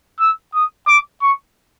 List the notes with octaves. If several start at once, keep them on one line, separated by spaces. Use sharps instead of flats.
E6
D#6
D6
C#6